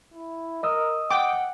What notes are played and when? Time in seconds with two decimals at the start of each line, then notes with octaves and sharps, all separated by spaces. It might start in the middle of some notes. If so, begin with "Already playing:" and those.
0.14 E4
0.63 A#4 D#5 D#6 E6
1.11 F#5 G5 D6